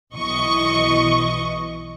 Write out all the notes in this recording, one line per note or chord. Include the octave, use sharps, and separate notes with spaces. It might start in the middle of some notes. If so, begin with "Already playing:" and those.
B1 E3 D#5 C#6